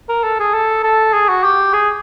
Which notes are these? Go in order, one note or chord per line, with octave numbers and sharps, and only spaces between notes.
A#4
A4
G#4
A4
A4
G#4
F#4
G4
G#4